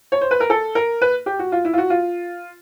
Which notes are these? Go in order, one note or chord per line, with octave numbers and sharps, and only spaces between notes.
C#5
C5
B4
A#4
A4
A#4
B4
G4
F#4
F4
E4
F4
F#4
F4